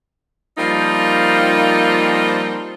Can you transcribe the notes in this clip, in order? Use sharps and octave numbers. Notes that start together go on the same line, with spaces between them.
F3 G3 A#3 C4 D#4 F4